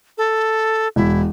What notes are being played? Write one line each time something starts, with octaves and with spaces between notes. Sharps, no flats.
A4
E1 E4